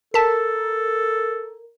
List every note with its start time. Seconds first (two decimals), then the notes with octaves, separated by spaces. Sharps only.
0.14 A4 A#4 A5 B6